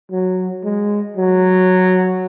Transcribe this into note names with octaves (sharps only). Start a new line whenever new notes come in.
F#3
G#3
F#3